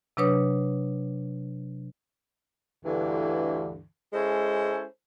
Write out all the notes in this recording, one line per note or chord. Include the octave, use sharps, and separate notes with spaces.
C3 F#3 D4 B4 C#5 D#6
D2 G2 D3 E3
G#3 C#4 E4 A4 C5